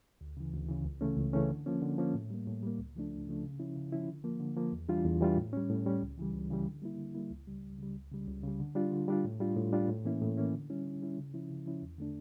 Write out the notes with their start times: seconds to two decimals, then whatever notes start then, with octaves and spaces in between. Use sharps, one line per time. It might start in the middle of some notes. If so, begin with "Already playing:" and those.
0.21 D2
0.37 C#3 E3
0.53 D2
0.69 C#3 E3
0.85 C#2
1.01 C#3 E3 A3 C#4
1.17 C#2
1.33 C#3 E3 A3 C#4
1.49 D3
1.66 F3 A#3 C#4
1.82 D3
1.98 F3 A#3 C#4
2.14 A2
2.31 G3 A#3
2.47 A2
2.63 G3 A#3
2.79 C#2
2.95 C#3 F3 A3 D4
3.11 C#2
3.27 C#3 F3 A3 D4
3.44 C#3
3.59 F3 C#4 E4
3.76 C#3
3.92 F3 C#4 E4
4.08 D3
4.24 F3 A#3
4.40 D3
4.56 F3 A#3
4.72 E2
4.89 E3 G3 D4 F4
5.04 E2
5.21 E3 G3 D4 F4
5.37 A2
5.53 G3 C#4
5.70 A2
5.86 G3 C#4
6.02 C#2
6.17 C#3 E3 G3
6.34 C#2
6.50 C#3 E3 G3
6.66 D3
6.82 G3 A#3 E4
6.98 D3
7.15 G3 A#3 E4
7.31 C#2
7.47 C#3 G3
7.63 C#2
7.79 C#3 G3
7.95 C#2
8.12 C#3 G3
8.27 C#2
8.43 C#3 G3
8.60 D3
8.75 G3 D4 F4
8.92 D3
9.08 G3 D4 F4
9.25 A2
9.40 G3 D4 F4
9.56 A2
9.73 G3 D4 F4
9.89 A2
10.05 E3 A#3 C#4 E4
10.21 A2
10.37 E3 A#3 C#4 E4
10.53 D3
10.70 G3 C#4 E4
10.85 D3
11.02 G3 C#4 E4
11.18 C#3
11.34 F3 C#4 E4
11.50 C#3
11.66 F3 C#4 E4
11.82 E2
11.98 D3 A3 D4